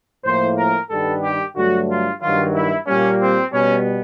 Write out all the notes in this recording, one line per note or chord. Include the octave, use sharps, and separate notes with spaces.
A2 F3 A#3 C5
A#4
G2 D#3 G3 B3 A4
G4
G2 D3 F#3 A3 F#4
F4
G2 D#3 F#3 F4
E4
A#2 G3 A#3 C#4
C4
B2 G3 B3 C#4